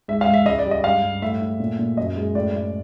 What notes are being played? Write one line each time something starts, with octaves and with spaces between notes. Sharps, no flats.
G#2 E5
F5
G#2
E5
C#2 D#5
D5
G3
D#5
G2 F5
G2
A2 E5
A2
A#2
A#2
F#2 D#5
G#3
A2 D5
A2